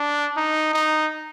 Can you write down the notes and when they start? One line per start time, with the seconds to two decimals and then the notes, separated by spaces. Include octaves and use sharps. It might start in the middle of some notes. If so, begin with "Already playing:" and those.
Already playing: D4
0.37 D#4
0.73 D#4